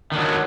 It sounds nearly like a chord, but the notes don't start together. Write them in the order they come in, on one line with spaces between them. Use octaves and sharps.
D#3 D4 F#3